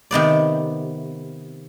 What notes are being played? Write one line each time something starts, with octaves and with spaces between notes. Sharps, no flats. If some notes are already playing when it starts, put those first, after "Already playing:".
C3 D#3 B3 D5